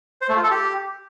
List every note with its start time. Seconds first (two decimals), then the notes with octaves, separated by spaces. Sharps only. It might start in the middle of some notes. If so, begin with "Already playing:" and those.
0.21 C5
0.29 A3
0.36 F4
0.43 A4
0.51 G4